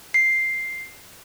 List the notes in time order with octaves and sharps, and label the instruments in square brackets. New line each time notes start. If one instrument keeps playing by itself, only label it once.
[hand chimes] C7